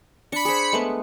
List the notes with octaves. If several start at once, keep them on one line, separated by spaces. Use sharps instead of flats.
D4 B5 C#7
G#4 C5
G#3 A3 B3